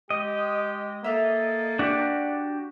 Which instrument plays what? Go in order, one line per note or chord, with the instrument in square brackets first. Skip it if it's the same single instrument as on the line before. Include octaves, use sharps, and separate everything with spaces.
[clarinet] G#3 [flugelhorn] G4 [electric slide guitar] D#5
[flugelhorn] A#3 [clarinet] A4 [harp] E5 F5
[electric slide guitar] D4 F#4 G4 [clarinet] D5